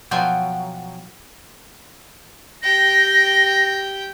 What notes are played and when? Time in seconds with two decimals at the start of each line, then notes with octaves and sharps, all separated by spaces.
0.11 B2 F3 F#3 G5 G#5
2.63 G4 G5 A#6